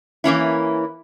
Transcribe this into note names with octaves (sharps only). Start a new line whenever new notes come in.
E3 A#3 C#4 E4